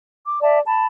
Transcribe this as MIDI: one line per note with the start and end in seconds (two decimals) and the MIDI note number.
0.24 0.38 86
0.41 0.59 74
0.41 0.59 76
0.41 0.59 81
0.66 0.85 81
0.66 0.85 83